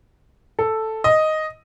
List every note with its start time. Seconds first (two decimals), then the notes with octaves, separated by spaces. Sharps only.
0.59 A4
1.04 D#5